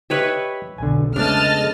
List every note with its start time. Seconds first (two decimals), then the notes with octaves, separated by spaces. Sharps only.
0.10 G4 B4 C#5 D#5 E5
0.78 B1 E2 B2 D3 G#5
1.16 C#3 G#3 A3 B3 D4 D#5 A5 F6